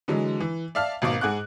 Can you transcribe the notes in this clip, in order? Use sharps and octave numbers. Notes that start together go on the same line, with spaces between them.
D3 E3 F#3 G#3
E3
D5 E5 F5 A5 F6
G#1 B2 A#3 D6
G#2 G#4 F#5 D6 F#6